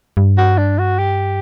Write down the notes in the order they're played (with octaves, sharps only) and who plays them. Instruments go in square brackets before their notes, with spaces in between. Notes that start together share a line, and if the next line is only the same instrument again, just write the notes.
[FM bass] G2
[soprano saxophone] F#4
D4
F#4
G4